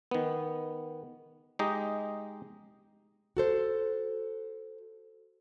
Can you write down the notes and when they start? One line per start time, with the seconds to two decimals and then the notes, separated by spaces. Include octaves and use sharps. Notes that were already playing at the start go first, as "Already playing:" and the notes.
0.11 D#3 B3
1.59 G#3 D#4 G4 D#5
3.37 F#4 A4 C5